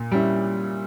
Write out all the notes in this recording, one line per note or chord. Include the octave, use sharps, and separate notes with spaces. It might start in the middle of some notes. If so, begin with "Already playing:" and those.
Already playing: A#2
G3 C#4 E4